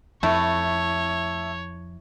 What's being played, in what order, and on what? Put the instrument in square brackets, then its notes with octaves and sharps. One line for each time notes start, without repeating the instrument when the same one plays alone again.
[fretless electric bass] F2 [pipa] A3 [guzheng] E4 [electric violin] C#5